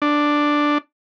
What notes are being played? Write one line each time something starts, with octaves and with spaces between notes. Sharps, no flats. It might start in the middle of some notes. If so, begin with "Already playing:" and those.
D4